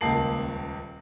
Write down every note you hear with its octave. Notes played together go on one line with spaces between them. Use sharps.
D#1 C#2 A#3 A5 C7 F#7